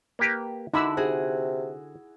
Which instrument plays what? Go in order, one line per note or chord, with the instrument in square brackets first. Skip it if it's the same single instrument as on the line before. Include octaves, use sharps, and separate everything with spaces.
[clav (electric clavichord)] A#3 G4 B4
[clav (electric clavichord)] D3 [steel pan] D#4 B5 E6 [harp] E4 F#4
[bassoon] C3 [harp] F#4 G#4